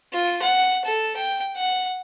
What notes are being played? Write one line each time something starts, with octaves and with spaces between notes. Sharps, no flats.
F4
F#5
A4
G5
F#5